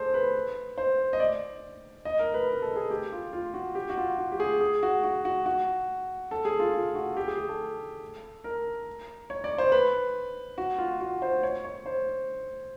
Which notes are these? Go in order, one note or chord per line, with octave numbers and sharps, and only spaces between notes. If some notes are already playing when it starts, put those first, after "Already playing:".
Already playing: G#4 A4 C5
B4
C5
D#5
D5
D#5
A#4
B4
A#4
A4
G#4
G4
F4
F4
F#4
G4
F#4
F4
F#4
G4
G#4
G#4
F#4
F#4
F#4
F#4
A4
G#4
F4
F4
F#4
G4
G#4
G#4
A4
A#4
C#5
D5
C5
B4
F#4
F4
F#4
C5
C#5
C#5
C5